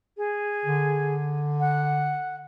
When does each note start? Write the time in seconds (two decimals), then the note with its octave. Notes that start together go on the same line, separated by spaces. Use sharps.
0.17 G#4
0.65 D3
1.60 F#5